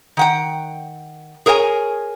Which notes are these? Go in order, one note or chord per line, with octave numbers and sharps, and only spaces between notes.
D#3 F#5 G5
G#4 A#4 C#5 F#5 G#5